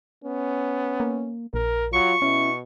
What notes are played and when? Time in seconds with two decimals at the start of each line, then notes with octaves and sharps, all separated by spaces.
0.24 B3 C#4
1.00 A#3
1.54 A#1 A#4
1.93 F#3 F4 C#6
2.22 B2 C#4 E4